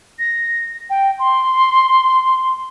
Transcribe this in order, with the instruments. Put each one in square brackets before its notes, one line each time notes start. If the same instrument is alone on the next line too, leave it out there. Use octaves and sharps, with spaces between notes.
[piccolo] A#6
G5
C6